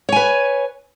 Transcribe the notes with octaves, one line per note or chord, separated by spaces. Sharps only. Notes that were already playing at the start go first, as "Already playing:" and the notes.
B4 C#5 G#5